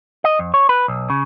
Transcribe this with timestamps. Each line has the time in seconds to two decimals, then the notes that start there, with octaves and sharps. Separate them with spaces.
0.24 D#5
0.39 F2
0.54 C#5
0.69 B4
0.88 B1
1.10 C#3